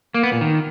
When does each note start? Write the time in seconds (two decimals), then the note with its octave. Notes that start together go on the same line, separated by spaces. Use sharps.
0.14 A#3
0.23 B3
0.32 A#2
0.41 D#3